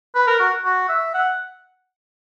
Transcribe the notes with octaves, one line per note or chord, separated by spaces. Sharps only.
B4
A#4
F#4
F#4
E5
F#5